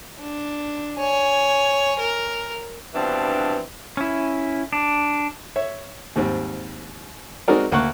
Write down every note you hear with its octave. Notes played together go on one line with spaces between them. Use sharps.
D4
C#5 G#5
A#4
G2 B2 E3 F3 C4 D4
C#4 E4
D4
C#5 E5
D#2 G#2 G3 C4
G#3 C4 D#4 F#4 A#4 D5
D2 A#3 F#5 C#6 F#6